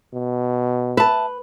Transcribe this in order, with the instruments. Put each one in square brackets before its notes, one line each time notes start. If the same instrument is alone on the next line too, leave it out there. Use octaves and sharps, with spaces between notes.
[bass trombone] B2
[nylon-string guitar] B4 [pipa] E5 A5